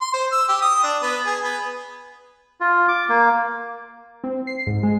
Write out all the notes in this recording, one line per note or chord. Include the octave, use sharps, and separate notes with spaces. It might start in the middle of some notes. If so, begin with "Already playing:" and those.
C6
C5
E6
G4
D#6
D4
B3
G#4
B3
F4
D6
A#3
C4
C7
G#2
G#3